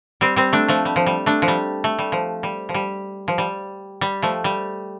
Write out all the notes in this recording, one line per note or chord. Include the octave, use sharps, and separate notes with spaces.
G3 C4
G3 C4
A3 D4
F3 A3
G3
F3
G3
A3 D4
F3
G3
A3
G3
F3
G3
F3
G3
F3
G3
G3
F3 A3
G3